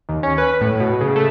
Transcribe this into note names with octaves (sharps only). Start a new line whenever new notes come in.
D#2
C#4
B4
A2
B2
C#3
A3